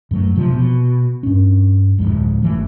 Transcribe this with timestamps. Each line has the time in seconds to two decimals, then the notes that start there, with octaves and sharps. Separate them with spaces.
0.11 F#2 F#3 A3
0.36 E1 C3 F3
0.53 B2
1.23 G2 C#4
1.98 D1 G1 F2 G#2
2.42 F#1 E3 A3